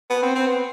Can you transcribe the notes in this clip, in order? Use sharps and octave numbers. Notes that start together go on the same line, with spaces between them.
B3
C4
C4
B3